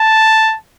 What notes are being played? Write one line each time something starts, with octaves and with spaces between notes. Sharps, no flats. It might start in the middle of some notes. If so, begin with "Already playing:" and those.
Already playing: A5